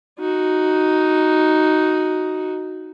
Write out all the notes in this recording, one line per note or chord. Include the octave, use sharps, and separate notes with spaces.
D#4 F#4